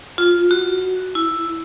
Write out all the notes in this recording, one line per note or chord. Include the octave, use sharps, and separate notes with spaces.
F4
F#4
E4